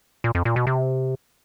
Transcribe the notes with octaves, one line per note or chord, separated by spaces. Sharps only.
A#2
F2
A#2
B2
C3